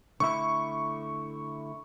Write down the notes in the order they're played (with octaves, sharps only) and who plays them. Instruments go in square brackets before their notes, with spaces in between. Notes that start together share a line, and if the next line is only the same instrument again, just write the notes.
[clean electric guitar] D3 A3 E4 [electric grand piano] C#6